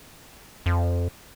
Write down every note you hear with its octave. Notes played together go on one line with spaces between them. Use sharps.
F2